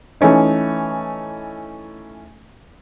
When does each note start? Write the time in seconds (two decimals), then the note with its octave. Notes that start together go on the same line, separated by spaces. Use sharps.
0.21 E3 A3 C#4 D#4